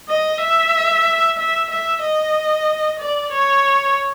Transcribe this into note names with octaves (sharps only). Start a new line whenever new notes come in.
D#5
E5
E5
E5
D#5
D5
C#5